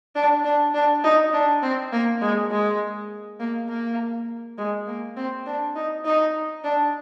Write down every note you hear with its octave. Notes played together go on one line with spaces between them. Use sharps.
D4
D4
D4
D#4
D4
C4
A#3
G#3
G#3
A#3
A#3
G#3
A#3
C4
D4
D#4
D#4
D4